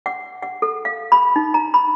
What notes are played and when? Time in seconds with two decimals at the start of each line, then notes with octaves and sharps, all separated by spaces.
0.06 F#5
0.43 F#5
0.62 A4
0.85 F5
1.12 B5
1.36 D#4
1.54 A#5
1.74 B5